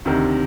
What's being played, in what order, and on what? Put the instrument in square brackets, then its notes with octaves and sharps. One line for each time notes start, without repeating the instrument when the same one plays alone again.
[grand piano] D2 C3 D#3